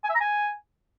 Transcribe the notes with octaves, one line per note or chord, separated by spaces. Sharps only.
G#5
E5
A#5
G#5